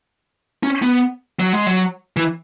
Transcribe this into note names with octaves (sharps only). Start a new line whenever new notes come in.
C#4
B3
F#3
G#3
F#3
E3